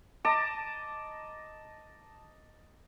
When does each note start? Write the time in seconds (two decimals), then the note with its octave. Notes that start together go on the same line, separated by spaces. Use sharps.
0.25 D#5 A5 A#5 D6